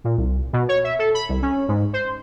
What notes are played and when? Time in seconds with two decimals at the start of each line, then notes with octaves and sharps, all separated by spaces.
0.04 A#2
0.17 C2
0.53 B2
0.69 C#5
0.84 E5
0.99 A4
1.14 B5
1.29 C2
1.42 C#4
1.68 G#2
1.93 C5